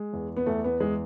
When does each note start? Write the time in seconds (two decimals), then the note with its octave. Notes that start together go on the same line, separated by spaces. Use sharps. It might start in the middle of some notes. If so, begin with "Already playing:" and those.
Already playing: G#3
0.13 E2
0.37 B3
0.46 E2 A3
0.64 B3
0.80 E2 G#3